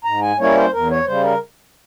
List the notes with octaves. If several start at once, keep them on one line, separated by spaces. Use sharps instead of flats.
G#2 A#5
G#5
G3 A#3 C#4 E4 C#5
C5
E2 A#4
C#5
C#3 G3 C5
A#4